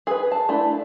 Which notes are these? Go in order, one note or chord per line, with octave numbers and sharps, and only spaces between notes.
G#4 B4
A5
A3 D4 E4